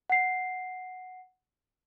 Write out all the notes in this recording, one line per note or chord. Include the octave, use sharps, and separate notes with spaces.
F#5 C7